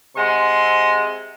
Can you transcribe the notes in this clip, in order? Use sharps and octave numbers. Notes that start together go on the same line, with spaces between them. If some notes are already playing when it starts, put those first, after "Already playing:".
C3 G#3 F#5 C6